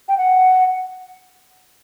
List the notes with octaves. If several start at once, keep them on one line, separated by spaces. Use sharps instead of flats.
G5
F#5